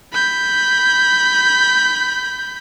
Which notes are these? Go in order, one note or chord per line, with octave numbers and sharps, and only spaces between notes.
B5 G6